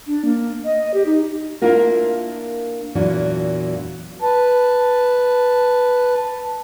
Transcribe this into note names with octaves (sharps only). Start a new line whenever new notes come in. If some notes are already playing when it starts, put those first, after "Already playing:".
D4
A#3
D#5
G4
D#4
A#3 D4 E4 F4 A#4
E2 A#2 E3 F#3 D4
B4 A5